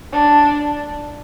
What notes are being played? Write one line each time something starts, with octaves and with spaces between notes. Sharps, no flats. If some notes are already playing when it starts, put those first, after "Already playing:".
D4